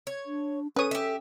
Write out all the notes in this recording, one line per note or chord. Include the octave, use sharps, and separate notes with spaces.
C#5
D4
C#4 A4 B4 C#5 D#6
G4 E5